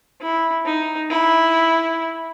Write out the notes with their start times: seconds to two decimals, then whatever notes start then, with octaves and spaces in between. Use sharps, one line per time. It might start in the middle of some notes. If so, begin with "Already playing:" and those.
0.22 E4
0.66 D#4
1.11 E4